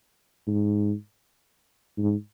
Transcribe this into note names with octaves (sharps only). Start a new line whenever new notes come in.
G#2
G#2